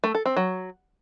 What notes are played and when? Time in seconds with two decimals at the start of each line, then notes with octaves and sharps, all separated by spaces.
0.04 A3
0.15 A4
0.26 C4
0.36 F#3